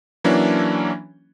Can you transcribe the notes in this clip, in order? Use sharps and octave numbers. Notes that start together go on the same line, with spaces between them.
E3 F#3 A#3 C#4 D4 E4